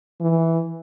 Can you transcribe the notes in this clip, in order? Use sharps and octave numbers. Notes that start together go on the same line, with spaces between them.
E3